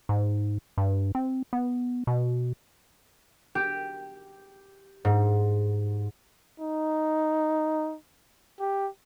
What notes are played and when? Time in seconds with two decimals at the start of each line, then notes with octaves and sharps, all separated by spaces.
0.09 G#2
0.78 G2
1.15 C4
1.53 B3
2.07 B2
3.55 G4
5.05 G#2
6.60 D#4
8.60 G4